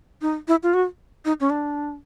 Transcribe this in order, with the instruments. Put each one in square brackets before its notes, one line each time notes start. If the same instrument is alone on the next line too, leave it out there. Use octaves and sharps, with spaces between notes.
[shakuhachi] D#4
E4
F4
F#4
D#4
C#4
D4